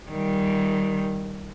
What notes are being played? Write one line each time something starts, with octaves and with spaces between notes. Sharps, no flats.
D#3 G3